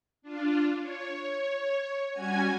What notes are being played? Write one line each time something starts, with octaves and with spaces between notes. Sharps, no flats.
D4 F4
C#5
G3 C#4 F#4 G#5 G#6